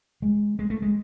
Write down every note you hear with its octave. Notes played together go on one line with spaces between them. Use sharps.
G#3
G#3
A3
G#3